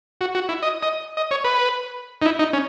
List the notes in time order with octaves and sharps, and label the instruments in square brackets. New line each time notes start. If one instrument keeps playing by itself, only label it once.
[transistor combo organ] F#4
F#4
E4
D#5
D#5
D#5
C#5
B4
D#4
E4
D#4
C#4